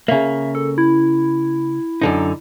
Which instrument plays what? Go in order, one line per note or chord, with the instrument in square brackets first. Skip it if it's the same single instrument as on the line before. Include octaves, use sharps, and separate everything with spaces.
[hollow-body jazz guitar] C#3 A#3 [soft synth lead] E5
[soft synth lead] A4
E4
[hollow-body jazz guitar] F#2 D3 D#4